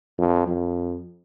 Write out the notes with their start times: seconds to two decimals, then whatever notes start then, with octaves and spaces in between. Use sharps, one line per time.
0.18 F2
0.48 F2